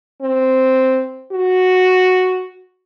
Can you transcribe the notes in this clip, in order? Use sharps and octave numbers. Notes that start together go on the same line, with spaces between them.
C4
F#4